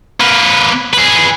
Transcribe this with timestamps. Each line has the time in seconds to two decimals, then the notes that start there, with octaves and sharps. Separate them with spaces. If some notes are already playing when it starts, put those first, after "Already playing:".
0.20 A#3 B4
0.94 G#4 B4